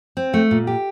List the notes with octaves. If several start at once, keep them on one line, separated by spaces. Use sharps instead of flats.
C4
A3
A#2
G4